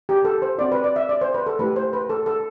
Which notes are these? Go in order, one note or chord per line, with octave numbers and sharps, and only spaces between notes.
G4
A4
C5
C4 F#4 D5
B4
D5
E5
D5
C5
B4
A4
A3 E4 G4 B4
C5
B4
A4
A4